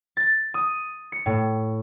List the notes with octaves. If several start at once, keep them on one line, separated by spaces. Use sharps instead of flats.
A6
D#6
C#7
A2